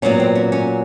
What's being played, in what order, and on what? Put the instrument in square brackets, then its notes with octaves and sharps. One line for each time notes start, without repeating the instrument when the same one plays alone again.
[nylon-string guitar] A#2 F#3 B3 C#4
C4
C#4
C#4